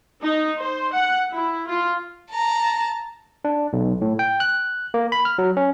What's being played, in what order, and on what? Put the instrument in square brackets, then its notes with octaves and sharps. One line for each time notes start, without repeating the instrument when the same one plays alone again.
[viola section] D#4
C5
F#5
E4
F4
[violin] A5 A#5
[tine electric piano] D4
B1
A2
G5
F#6
A#3
B5
F6
F#3
C#4